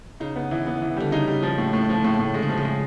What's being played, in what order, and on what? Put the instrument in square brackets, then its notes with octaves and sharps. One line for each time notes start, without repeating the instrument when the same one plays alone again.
[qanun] C#3 [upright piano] D#4
[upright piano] B3
E3
B3
E3
[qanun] D3 [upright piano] G3
[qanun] C#3 [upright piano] D#4
[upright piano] G3
F3
A2
A2
F3
[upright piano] A2 [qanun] C#3
[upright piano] A2
[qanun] D3 [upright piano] G#3
[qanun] C#3
[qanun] C3 [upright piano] F3
[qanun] C#3
[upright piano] G#3